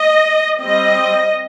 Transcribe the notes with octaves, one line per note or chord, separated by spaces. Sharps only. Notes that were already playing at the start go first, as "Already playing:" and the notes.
Already playing: D#5
G3 C4 D#5